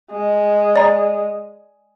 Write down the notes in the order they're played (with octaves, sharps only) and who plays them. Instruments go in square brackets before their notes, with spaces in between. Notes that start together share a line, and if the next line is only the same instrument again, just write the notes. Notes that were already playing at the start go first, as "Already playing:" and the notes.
[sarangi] G#3
[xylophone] D5 A#5